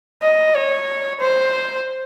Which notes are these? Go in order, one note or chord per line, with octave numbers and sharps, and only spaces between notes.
D#5
C#5
C5